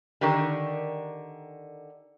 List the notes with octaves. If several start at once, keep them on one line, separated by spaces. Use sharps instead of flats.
D3 D#3 G4 A#4 D5